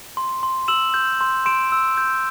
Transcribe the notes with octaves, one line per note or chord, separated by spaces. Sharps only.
C6
C6
E6 E7 F#7
G6
C6
C6 D7 E7
E6
G6